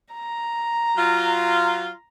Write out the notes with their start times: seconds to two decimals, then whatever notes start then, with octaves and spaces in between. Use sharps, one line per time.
0.14 A#5
0.97 F#3 F4